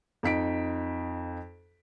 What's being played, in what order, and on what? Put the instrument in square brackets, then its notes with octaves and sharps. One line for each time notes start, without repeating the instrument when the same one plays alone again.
[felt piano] F2 D#4 B6 D7